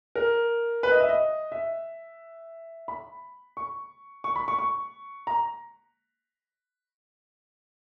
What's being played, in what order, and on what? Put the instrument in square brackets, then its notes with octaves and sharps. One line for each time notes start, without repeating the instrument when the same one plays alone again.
[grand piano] A#4
B4
D#5
E5
D#5
E5
B5
C#6
C#6
B5
C#6
C#6
A#5